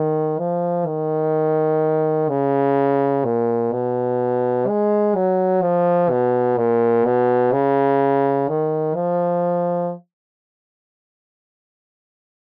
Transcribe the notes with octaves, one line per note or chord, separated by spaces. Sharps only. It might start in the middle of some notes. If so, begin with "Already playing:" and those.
Already playing: D#3
F3
D#3
C#3
A#2
B2
G#3
F#3
F3
B2
A#2
B2
C#3
D#3
F3